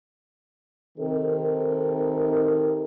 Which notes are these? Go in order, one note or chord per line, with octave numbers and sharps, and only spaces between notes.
C3 D#3 C4 D#4 A4 A#4